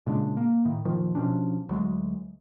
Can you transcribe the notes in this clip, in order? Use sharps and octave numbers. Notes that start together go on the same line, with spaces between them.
A#2 C#3 G#3 D4
A#3
A2 D#3
F1 A#2 D#3 F3
B2 F3 C#4 D4
D2 F#3 G#3